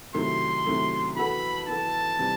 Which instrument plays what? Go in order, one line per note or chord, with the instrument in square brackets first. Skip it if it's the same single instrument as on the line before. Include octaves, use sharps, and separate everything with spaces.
[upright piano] C3 D#3 F#3 A3 E4 [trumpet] C6
[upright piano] C3 D#3 F#3 A3 E4
[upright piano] E3 B3 F#4 A4 [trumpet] B5
[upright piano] E3 B3 F#4 A4 [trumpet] A5
[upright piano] C3 E3 G3